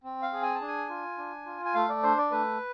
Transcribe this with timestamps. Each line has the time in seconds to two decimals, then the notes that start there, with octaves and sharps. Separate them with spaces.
0.04 C4
0.22 F5
0.33 G#4
0.42 G#5
0.55 A5
0.61 D4
0.68 G#5
0.89 F4
1.18 D4
1.46 F4
1.65 G#5
1.75 A3 F5
1.89 D5
2.03 D4 C5
2.17 D5
2.31 A3 B4